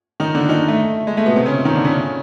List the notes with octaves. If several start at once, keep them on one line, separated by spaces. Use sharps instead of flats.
D#3 D#4
D3 D4
D#3 D#4
A3
G#3
A3
B2 B3
C3 C4
C#3 C#4
D#3 D#4
D3 D4
C#3 C#4